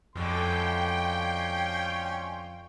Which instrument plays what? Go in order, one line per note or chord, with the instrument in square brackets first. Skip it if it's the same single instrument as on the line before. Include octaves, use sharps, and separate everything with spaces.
[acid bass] F2 [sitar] B2 D3 G#3 [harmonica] C#4 C6 [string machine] G5